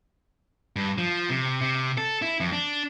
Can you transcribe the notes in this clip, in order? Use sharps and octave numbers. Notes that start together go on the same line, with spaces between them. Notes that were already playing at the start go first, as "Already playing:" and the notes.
G2
F3
C3
C3
A4
E4
F2
D4